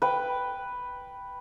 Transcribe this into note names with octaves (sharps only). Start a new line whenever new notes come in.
B4 G5